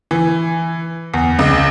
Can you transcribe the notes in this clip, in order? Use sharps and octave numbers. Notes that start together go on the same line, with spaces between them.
E3
E2
C#2